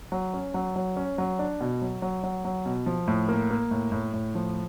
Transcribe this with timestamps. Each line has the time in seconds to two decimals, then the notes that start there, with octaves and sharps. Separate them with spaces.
0.12 F#3
0.34 C#4
0.54 F#3
0.76 F#3
0.97 C#4
1.18 F#3
1.39 D4
1.61 B2
1.82 F#3
2.02 F#3
2.24 F#3
2.45 F#3
2.66 B2
2.86 F3
3.08 A2
3.28 A#3
3.50 A#3
3.71 A2
3.92 A2
4.13 A2
4.35 F3